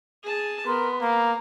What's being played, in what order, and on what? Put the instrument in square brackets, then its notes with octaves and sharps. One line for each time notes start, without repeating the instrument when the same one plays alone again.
[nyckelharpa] G#4 A5
[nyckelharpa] B3 [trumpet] A#4 [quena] C6
[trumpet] A#3 [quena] A#5